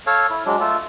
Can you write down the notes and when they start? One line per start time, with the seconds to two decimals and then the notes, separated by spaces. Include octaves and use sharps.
0.07 A4 C#5 F5
0.30 E4
0.46 F#3 G#3 D4
0.60 A3 F4 A4